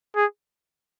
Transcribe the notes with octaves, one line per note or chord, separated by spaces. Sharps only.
G#4